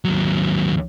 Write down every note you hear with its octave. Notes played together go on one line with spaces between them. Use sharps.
D#2 F#3